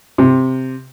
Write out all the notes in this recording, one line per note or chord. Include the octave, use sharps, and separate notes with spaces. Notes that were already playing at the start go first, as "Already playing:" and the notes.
C3